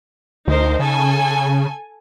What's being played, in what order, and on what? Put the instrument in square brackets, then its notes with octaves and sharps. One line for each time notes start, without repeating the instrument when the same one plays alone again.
[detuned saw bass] D2 [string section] D#4 A#4 C5
[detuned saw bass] C#3 [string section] A4 G#5